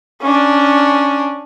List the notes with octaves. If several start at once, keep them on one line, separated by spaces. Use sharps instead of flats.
C#4 D4